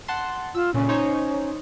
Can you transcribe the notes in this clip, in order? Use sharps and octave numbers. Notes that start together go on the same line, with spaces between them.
F#5 A5 C6
F4 E6
A#2 C#3 C#4
D#4 C5 C#5